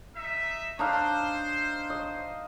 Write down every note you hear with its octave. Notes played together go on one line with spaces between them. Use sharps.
D#4 E5
D4 D#4 C5 F5
D#5